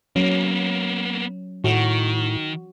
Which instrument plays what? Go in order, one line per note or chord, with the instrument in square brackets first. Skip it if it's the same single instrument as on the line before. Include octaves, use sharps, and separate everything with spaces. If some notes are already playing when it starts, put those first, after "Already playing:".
[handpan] F#3 C#4 [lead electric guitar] A#3 B3
[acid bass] A2 [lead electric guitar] D#3 [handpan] F#4